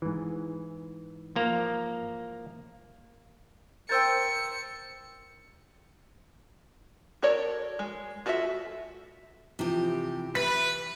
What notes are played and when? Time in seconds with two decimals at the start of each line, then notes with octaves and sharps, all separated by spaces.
0.02 G#2 E3
1.36 F3 A#3 A#5
3.89 A#4 C5 G5 E6 G6 A6 C#7
7.22 F#4 A4 A#4 C#5 D5
7.79 G#3
8.26 F4 F#4 A4 D5 E5
9.59 C3 E3 F3 G4
10.35 E3 B4 B6